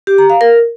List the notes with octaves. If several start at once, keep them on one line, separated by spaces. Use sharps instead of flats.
G4
A#5
F5
A#4